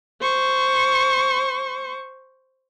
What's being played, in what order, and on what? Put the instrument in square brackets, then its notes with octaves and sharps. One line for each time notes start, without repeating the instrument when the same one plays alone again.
[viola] C5 C#6